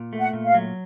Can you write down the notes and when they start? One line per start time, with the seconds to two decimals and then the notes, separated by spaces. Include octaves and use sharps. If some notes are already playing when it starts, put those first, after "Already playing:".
Already playing: A#2
0.13 A3
0.20 F#5
0.33 A#2
0.47 F5
0.54 F#3